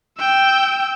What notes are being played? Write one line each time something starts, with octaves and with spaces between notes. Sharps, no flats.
G5 E6